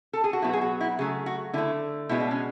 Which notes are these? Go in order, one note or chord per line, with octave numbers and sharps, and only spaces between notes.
A4
G#4
F#4
B2 F#3 B3 E4
G#4
F#4
E4
C#3 F#3 A3 G#4
F#4
D3 A3 E4
B2 G#3 B3 E4
D4
C#4